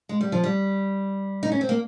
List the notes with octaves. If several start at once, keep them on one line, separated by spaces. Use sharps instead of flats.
G#3
G3
F3
G3
D#4
C#4
C4
A#3